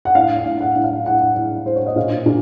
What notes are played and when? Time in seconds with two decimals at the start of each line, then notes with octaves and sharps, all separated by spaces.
0.05 F#5
0.15 A2 F5
0.38 F5
0.46 A2
0.61 F#5
0.76 A2
0.84 F5
1.06 A2 F#5
1.21 F#5
1.36 A2
1.66 A2 C5
1.76 C#5
1.86 D#5
1.96 A#2 F5
2.26 A#2